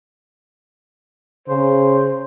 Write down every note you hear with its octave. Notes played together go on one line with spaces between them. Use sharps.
C#3 C5